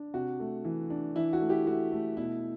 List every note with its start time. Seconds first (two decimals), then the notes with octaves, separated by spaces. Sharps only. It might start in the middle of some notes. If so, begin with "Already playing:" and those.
Already playing: D4
0.14 C3 F#4
0.40 A3
0.65 E3
0.90 D4
1.16 E3 E4
1.33 F#4
1.41 A3
1.49 E4 G4
1.66 A3 F#4
1.92 A3
2.17 B2 E4